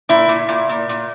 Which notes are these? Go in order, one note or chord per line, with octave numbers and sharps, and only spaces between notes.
A#2 E4
A#2
A#2
A#2
A#2